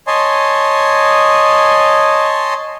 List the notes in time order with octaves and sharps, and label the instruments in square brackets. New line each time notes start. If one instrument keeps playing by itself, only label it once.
[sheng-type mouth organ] C#5 D#5 G#5 A5 C6